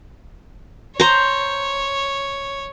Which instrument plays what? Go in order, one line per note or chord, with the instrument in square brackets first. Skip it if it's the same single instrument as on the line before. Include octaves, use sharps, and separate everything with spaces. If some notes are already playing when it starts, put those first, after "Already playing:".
[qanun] C5 A#5 [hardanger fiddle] C#5